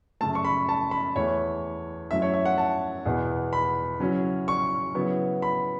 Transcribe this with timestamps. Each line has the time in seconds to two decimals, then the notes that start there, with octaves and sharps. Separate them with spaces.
0.21 F#2 C#3 A3 A5
0.35 C#6
0.45 B5
0.69 A5
0.91 B5
1.16 E2 E3 A3 E4 C#5
2.11 F#2 F#3 A3 E4 E5
2.22 C#5
2.34 E5
2.45 F#5
2.58 A5
3.06 E2 B2 B3 E4
3.53 B5
4.00 C#3 F#3 C#4 E4
4.48 C#6
4.94 C#3 F#3 B3 E4
5.42 B5